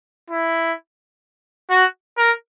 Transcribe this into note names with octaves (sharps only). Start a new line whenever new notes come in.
E4
F#4
A#4